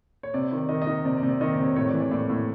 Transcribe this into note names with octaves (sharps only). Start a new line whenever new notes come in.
C#5
C3 D5
D#3
D5
D#3 D#5
D#5
D#3
C3 D5
D5
C3
D5
D#3 D#5
D5
C3
C#5
A2 C#5
D5
E3
D5
A2 D5
A2